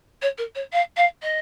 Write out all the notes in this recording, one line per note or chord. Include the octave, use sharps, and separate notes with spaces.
C#5
A#4
C#5
F5
F5
D#5